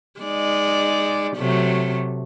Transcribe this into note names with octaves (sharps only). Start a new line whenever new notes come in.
G#3 D#4 D5
C3 F#3 A3